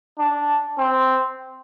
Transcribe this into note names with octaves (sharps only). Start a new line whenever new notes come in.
D4
C4